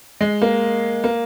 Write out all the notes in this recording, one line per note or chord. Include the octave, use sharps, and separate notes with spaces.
G#3
A#3
A#3